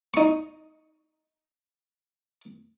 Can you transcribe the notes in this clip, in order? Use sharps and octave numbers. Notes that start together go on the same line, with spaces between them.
D#4 C#6